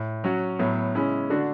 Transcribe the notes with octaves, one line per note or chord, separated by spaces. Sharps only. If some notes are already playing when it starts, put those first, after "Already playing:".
Already playing: A2
F#3 C#4 F#4
A2 F#3 B3
C#3 G#3 C#4 E4
D3 A3 D4 F#4